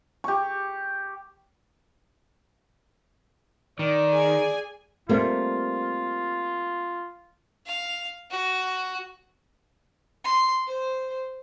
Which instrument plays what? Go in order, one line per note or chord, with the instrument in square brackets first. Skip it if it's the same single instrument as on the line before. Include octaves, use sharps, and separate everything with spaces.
[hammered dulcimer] G4 C#6
[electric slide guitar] D#3 [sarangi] D5
[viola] G#4 G#5
[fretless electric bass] G3 A3 C4 [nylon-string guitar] A#3 [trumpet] F4
[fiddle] F5
F#4
[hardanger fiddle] C6
C5